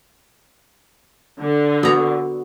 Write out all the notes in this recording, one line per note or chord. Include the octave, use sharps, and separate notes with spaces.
D3
B3 F#4 A#5